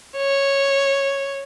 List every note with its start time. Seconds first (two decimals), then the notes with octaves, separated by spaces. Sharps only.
0.17 C#5